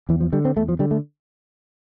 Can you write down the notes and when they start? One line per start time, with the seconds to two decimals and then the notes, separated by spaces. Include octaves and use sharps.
0.09 E2 E3
0.20 F3
0.33 D3 G3
0.45 C4
0.56 E2 A3
0.69 F3
0.79 D3 G3
0.91 A3